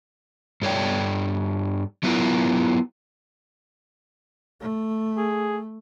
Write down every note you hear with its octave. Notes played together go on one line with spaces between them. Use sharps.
G2 A4 C#5 D5 G5
F#3 B3 E4 F4 A#4
A3
G#4